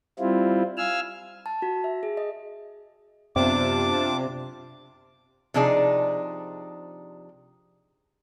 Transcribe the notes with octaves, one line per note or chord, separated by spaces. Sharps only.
G3 C4 E4 F4
F5 G#5 E6 F6
A5
F#4
E5
G#4
D#5
F#2 C3 B3 D4 F4 A5 D6
C3 F3 D4 D#4 G#4